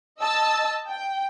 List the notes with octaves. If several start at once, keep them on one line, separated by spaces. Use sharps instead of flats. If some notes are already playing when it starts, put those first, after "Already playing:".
D#5 A5 E6
G5